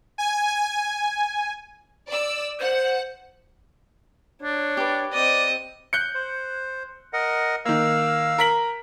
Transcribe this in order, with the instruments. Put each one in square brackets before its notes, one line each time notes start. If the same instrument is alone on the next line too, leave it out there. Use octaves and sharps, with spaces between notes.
[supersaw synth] G#5
[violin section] D5 E6
[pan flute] C5 [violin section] F#5
[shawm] D4 [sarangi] C#5
[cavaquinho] G4 B4
[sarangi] C4 [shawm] D5 [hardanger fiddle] D#5
[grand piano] F#6 G6 C#7
[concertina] C5
A#4 D#5 F#5
[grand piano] D#3 A#3 [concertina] F5 E6
[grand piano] A#4 B6 F#7